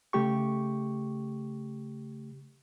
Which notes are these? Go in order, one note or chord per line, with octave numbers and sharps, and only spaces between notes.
C#3 A3 G4 C#6